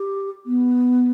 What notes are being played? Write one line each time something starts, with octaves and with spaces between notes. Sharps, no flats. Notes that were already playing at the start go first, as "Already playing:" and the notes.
Already playing: G4
B3